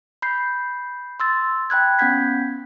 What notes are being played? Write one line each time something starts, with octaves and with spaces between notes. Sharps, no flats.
B5 G6 C7
C6 E6 A6
G5 B5 F#6 G#6
B3 C#4 F#5 G6 G#6 B6